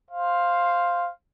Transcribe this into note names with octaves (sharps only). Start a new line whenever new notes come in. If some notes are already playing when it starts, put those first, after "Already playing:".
C5 F5